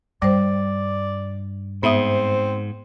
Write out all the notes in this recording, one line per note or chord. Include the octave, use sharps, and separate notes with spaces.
G2 G3 C5 D5
G#2 B3 C4 E5 D#6